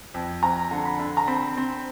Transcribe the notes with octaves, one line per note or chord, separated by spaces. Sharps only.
F2
F2 A#5
D3
B5
D3
A#5
C4 B5
C4